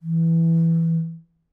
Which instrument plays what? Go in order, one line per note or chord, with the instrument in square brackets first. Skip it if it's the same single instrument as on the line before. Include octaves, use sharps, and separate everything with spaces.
[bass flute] E3